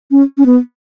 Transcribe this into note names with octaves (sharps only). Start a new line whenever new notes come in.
C#4
C#4
B3